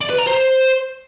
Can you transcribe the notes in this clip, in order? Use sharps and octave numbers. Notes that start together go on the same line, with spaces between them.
D5
B4
A#5
C5